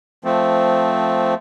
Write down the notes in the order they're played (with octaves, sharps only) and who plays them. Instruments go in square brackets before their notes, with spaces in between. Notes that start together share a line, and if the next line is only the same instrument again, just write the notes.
[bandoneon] F3 A3 C4